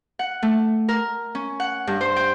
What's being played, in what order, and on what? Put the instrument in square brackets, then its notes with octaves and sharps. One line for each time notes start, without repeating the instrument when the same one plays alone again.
[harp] F#5
A3
A#4
C#4
F#5
G2
C5
G5